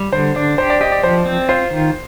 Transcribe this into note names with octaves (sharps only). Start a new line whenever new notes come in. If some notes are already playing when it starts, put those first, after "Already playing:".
Already playing: G3
D3 C5
D4 D5
G4 C5
D5
G4 D#5
D5
F3 C5
C4
F4 C5
D#3